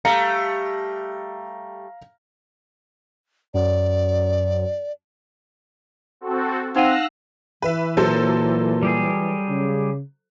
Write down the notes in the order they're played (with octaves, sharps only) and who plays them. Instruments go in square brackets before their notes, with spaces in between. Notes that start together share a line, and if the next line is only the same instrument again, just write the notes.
[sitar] G3 A3 [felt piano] F5 A#5 C#7
[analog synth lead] F#2 [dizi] D5
[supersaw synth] C4 F#4 A4
[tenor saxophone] C4 [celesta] D#4 F#5 D#7 [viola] F5 [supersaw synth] E6 F#6 A#6
[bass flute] E3 [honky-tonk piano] B4 E5
[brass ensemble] A#2 [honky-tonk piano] F#3 A4 C5
[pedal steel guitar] G3 G4 G#4
[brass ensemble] C#3